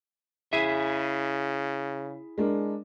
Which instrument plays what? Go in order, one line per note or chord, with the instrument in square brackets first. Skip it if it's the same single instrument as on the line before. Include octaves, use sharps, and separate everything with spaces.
[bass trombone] C#3 [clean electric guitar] E4 G#4 E5 [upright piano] D#7
[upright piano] G#3 D4 A#4